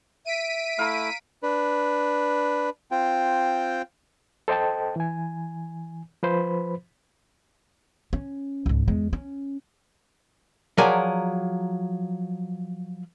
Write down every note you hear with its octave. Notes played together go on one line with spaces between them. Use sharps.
E5 B6 D7 D#7
A3 E4 F5 A#5
D4 B4
C4 F4 G5
A4 C5 D#5 G5 A5
E3 G#5
F3 B4 C5 B5
C#4
C#2 G#2
E2 G#3
C#4
F3 F#3 G#4 A#4 D5 G#5